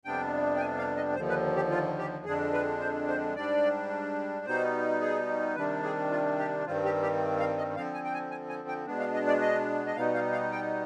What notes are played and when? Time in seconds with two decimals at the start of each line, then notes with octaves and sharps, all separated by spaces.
0.05 F2 C3 G3 B3 D4 G5
0.56 G5
0.60 G#5
0.78 F5
0.97 D#5
1.15 D#2 D3 F3 C5
1.29 B4
1.56 G4
1.71 F4
1.98 G4
2.25 F2 D3 G#3 D4 G#4
2.53 B4
2.80 C5
3.08 C5
3.36 G#2 G3 D4 D5
4.46 B2 G3 B3 D#4 C5
5.01 G#4
5.55 C3 D#3 G3 D4 B4
5.83 G#4
6.11 F4
6.38 G4
6.66 G2 D#3 G3 C4 F4
6.85 G4
7.02 G4
7.40 F5
7.58 D#5
7.76 D3 F3 C4 F5
7.94 G#5
8.04 G5
8.13 G#5
8.31 G#5
8.49 G#5
8.68 G5
8.87 B2 G#3 B3 D4
9.00 F5
9.14 D#5
9.27 D5
9.41 D#5
9.86 D#5
9.96 B2 G3 B3 D#4 F5
10.14 F5
10.32 F5
10.52 G5